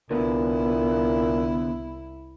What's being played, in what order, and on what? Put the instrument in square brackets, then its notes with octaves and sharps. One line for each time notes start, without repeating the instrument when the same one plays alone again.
[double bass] C2 E4 [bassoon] A#2 [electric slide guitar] D3 B3